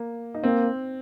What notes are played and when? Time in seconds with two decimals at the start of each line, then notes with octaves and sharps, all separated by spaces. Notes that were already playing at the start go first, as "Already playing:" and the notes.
Already playing: A#3
0.34 D#4
0.43 A#3 C4